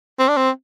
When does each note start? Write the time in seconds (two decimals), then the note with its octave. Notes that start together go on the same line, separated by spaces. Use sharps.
0.19 C4
0.28 D4
0.37 C4